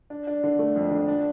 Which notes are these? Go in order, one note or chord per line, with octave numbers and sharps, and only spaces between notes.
D4
D4
D3
A3
F2
D3
D4